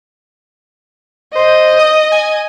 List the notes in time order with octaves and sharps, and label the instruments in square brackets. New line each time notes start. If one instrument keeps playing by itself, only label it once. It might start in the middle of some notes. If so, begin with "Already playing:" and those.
[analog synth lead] C5 [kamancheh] D#5
[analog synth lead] D#6
G#5